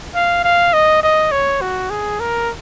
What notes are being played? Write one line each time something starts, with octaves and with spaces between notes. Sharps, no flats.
F5
F5
D#5
D#5
C#5
F#4
G#4
A#4